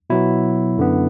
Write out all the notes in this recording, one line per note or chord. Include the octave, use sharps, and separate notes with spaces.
B2 F#3 B3 E4
F#2 D3 B3